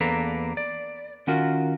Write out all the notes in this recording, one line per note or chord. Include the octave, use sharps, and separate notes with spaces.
E2 A#3 D4 A4 B4 A#5
D5
D#3 C#4 F4 F#4 A#4